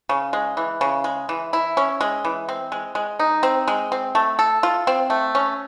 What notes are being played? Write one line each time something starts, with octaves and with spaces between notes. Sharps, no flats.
C#3
G#3
E3
C#3
G#3
E3
E4
C#4
G#3
E3
C4
G#3
G#3
D#4
C4
G#3
C4
A3
A4
F4
C4
A3
C#4